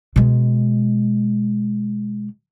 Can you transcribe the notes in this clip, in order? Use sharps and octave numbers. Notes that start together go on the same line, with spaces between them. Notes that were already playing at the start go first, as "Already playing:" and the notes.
B2 G#3